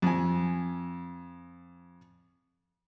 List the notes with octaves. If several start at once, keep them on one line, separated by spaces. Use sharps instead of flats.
F2 G#5